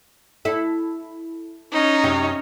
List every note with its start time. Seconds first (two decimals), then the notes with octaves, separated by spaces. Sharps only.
0.45 E4 A4
1.72 C#4 D#4 C#5
2.04 F#2 C3